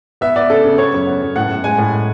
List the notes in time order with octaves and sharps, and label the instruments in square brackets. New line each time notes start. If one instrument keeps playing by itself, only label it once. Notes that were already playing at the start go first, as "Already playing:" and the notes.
[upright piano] B3 E5
B3 D5
C#3 A4
C#3
B3 C#5
F#2
B3
F#2
A2 F#5
A2
G#3 G#5
A2